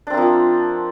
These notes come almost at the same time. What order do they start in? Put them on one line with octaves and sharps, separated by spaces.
D4 C4 A#3 F3